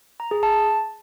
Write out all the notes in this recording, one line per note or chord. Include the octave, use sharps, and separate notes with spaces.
A#5
G#4
A5